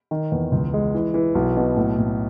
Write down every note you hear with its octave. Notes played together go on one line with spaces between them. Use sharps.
D#3
E2
C#2
G#3
E3
E3
B1
B2
A2
A2